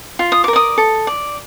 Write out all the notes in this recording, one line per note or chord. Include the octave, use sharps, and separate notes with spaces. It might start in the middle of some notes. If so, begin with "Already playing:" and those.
F4
D#6
A#4 D6
D5 D#6
A4
D5